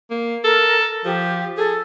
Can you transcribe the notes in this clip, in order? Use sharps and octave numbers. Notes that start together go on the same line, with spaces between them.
A#3
A4 A#4
F3 G4
G#4 A4